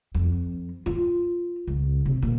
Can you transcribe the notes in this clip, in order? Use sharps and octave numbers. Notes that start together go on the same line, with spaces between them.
F2
F4
C#2
C3
A#2